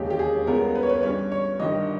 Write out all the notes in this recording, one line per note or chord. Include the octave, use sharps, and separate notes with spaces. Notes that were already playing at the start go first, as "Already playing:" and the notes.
Already playing: E1 D#2 C#3 G#3 G4
G4
G#4
C#2 C#3 G3 B3 A#4
B4
C#5
B4
G2 G3 C#4 C#5
C#5
G1 G2 D#3 D#5